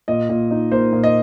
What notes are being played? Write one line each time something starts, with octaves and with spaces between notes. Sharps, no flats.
A#2 D#5
A#2
D#4
A#3 C5
A#2
D#5